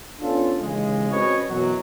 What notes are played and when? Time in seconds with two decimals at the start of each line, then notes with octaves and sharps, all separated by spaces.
0.20 B3 C#4 D4 F4 A4
0.60 D#2 C#3 E3 G#3
1.11 C4 C#4 F#4 B4 C#5 D#5
1.47 F#2 B2 E3 F#3